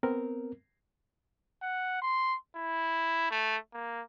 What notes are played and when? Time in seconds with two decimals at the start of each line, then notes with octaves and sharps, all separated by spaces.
0.03 B3 C4 A#4
1.62 F#5
2.02 C6
2.56 E4
3.31 A3
3.73 A#3